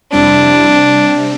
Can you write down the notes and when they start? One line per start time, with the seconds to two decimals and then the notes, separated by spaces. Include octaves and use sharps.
0.12 F2 C3 G3 C4 D4 E4
0.64 C3 G3 C4